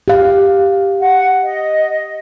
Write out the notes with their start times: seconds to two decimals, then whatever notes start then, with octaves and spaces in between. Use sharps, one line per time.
0.08 G4 F5
0.99 F#5
1.43 D#5